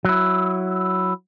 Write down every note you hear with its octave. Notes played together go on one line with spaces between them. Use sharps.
F#3 E4